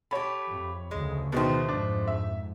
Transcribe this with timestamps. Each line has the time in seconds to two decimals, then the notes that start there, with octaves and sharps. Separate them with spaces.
0.11 A3 G4 C#5 B5
0.48 F2
0.91 D2 C#3 G#3
1.32 B2 D#3 G#3 A3 C5
1.69 F2 G#2 D4
2.07 E5